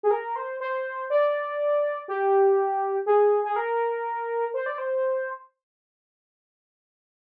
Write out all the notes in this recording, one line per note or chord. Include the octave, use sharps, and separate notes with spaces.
G#4
A#4
C5
C5
D5
G4
G#4
G#4
A#4
C5
D5
C5